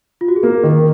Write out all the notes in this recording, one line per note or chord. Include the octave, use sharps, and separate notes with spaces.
F4
F#4
G#4
A#3 A#4
D#3